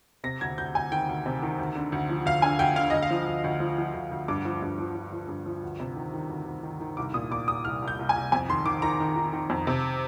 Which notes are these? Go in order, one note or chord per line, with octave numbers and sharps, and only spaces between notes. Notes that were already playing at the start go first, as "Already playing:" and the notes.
C3 A#6
D2 G#6
D2 G6
D2 G#5
D#3 G5
D2
C3
D#3
D2
D3
D2
F3
D2 F5
D3 G#5
D2 G5
D3 F5
D2 D#5
F5
F3
D2
D2
F3
F3
D2
D2
G2 D6
F3
G2
F3
F3
F3
G2
F3
D2
C3
D#3
D#3
D2
D2
D#3
D#3
C2 D6
A#2 D#6
A#2 D6
A#2 D#6
C2 F6
C2
G6
C2
G#5
C2
F2 G#5
D#3 C6
D#3 D6
D#3 A#5
D#3
D#3
D#3
F2
C3